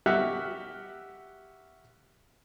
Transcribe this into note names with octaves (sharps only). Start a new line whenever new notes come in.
F#4 G4 E5 F#5 F6 F#6